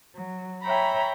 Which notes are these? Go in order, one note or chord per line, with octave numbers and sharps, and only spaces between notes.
F#3
C#5 E5 G5 A#5 B5